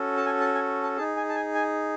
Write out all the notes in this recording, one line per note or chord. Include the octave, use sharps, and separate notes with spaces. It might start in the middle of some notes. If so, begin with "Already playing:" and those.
Already playing: C#4 F#4 A4
A5
G#5
A5
G#5
A5
D#4 G#4 A5
G#5
A5
G#5
G#5